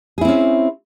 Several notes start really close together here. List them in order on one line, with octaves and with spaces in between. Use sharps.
G#4 E4 C4 C#4